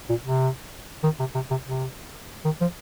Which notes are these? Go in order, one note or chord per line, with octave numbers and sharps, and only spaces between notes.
A#2
C3
D#3
C3
C3
C3
C3
D#3
F3